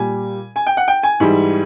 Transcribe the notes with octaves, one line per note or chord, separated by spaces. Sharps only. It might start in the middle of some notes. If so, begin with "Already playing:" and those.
Already playing: A#2 G3 G#5
G#5
G5
F#5
G5
G#5
G#2 E3 G3